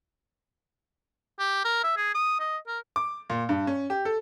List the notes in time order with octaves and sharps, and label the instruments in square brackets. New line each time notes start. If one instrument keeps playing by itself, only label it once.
[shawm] G4
A#4
E5
G#4
D#6
D#5
A#4
[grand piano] D6
A#2
G2
C#4
G4
A4